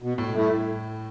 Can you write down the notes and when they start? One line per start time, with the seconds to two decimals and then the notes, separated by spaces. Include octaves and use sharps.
0.02 B2
0.18 A2
0.34 G2 A3 E4
0.50 A2